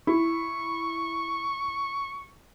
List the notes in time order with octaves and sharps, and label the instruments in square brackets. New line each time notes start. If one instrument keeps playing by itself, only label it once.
[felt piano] E4 [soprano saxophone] C#6